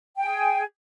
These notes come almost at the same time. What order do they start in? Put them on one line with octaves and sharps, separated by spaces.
G5 G#5 G#4